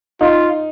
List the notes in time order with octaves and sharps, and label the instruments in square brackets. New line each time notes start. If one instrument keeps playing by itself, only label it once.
[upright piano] D#4 [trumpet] F4